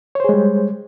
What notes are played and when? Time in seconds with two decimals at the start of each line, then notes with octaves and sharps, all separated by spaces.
0.15 C#5
0.20 C5
0.24 G#4
0.29 G#3
0.34 G3